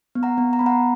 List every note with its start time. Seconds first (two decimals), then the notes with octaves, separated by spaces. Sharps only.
0.15 B3
0.23 F#5 A#5
0.38 B3
0.53 A#5
0.59 B3 B5
0.66 F#5 A#5